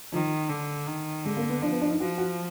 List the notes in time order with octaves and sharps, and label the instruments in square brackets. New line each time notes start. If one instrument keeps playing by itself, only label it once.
[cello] D#3 [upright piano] F3
[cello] D3
D#3
[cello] D3 [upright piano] G#3
[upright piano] A#3
B3
[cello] F3 [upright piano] D4
[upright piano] B3
D4
D#4
[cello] F3 [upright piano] F#4
[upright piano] F#4